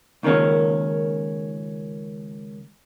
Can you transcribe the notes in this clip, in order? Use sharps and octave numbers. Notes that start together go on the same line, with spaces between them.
C#2 D#3 A#3 C#4